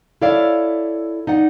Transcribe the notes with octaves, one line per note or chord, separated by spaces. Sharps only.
E4 A4 C#5 D5 E5 F5
D#4 D5 F#5